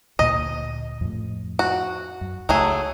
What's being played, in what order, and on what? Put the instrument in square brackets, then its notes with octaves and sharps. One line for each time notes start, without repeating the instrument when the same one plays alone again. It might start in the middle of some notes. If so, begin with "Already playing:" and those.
[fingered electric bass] D2 A#2 A#3 [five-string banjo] D#5
[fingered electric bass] F2 A2
[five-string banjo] F#4
[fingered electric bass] F#2
[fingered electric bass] C#2 [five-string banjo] F#3 A3 G#4